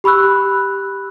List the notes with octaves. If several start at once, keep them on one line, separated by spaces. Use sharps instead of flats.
G4 B5 C#6 E6 F#6